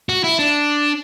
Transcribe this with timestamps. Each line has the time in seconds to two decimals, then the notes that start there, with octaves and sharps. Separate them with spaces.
0.09 F#4
0.24 E4
0.39 D4